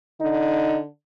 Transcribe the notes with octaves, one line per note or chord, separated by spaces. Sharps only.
D3 D#4